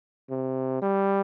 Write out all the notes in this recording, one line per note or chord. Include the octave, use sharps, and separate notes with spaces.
C3
G3